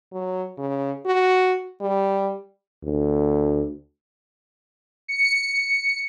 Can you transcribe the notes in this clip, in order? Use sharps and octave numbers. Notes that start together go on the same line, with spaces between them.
F#3
C#3
F#4
G3
D2
C#7